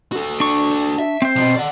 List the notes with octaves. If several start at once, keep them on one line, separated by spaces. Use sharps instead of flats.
F#4 A4
D4 C#6
E5
C4 C5
B1 B2
D5 F#5